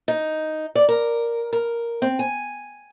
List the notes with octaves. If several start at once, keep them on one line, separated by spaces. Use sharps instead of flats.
D#4
D5
A#4
A#4
C4
G#5